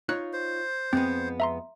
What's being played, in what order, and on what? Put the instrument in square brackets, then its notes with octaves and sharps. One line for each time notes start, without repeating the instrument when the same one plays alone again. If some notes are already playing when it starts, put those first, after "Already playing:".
[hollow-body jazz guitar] D#4 F4 C#5 [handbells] F#6
[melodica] C5
[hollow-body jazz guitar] F2 G#3 B3 [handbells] C4
[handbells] E5 A#5 C6